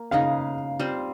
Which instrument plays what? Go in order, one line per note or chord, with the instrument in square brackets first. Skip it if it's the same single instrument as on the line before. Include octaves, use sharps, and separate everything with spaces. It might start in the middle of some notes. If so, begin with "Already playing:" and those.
Already playing: [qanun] A#3
[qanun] C#3 G#3 D#4 [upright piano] F5
[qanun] G3 C4 F4 C5